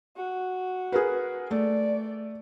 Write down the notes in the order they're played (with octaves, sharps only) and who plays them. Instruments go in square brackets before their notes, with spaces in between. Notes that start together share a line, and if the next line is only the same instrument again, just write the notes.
[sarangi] F#4
[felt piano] G#4 A#4 B4
[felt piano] A3 [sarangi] D5